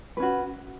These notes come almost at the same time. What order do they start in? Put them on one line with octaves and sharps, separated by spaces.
B4 C#4 F#4